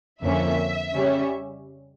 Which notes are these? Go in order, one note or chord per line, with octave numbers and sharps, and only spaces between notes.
F2 D3 F3 A#3 C#4 E5
C#3 G3 C#4